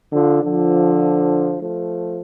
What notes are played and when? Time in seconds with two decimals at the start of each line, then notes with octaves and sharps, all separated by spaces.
0.12 D3 F3
0.42 D3 F3
1.61 F3 A3